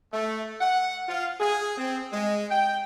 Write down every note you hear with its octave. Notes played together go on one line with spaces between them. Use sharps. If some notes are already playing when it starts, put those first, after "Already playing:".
A3
F#5
F4
G#4
C4
G#3
G5